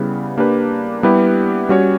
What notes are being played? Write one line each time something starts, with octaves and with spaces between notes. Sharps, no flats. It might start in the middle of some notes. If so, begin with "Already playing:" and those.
Already playing: C#3 G3 B3 E4 B4
A#3 D4 G4 B4
G3 B3 E4 G4 B4
G3 C#4 F#4 C#5